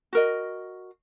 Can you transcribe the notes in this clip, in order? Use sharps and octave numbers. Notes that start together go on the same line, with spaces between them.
F#4 A#4 D#5